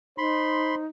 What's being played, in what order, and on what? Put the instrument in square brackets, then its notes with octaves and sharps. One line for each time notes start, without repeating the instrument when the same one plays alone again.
[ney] D#4 [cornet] C5 [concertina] B5 C6